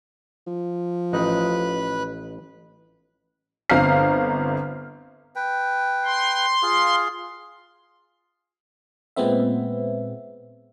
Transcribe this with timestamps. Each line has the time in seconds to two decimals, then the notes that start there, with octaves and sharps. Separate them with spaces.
0.47 F3
1.13 A1 D#4 B4 F#6
3.70 G1 C4 F5 A#5 F6 C7
5.36 B4 G5
6.06 C6
6.63 F4 G#4 F5
9.16 A#2 G#3 B3 C4 E5